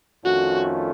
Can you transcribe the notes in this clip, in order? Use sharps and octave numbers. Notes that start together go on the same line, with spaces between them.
F2 D#3 A3 C#4 F4 F#4